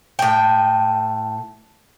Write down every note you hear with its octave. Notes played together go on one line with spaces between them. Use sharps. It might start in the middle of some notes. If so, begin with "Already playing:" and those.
A2 G5